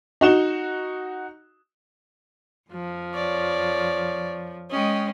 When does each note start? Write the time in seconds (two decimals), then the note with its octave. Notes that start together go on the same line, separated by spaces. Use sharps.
0.21 D#4 F#4 E7 G7
2.69 F2 F3
3.14 C#5 D5
4.71 G#3 C#4 D#5 G5